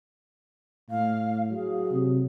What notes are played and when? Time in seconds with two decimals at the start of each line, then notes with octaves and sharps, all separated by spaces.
0.90 A2 F5
1.52 F#3 G#4
1.92 C3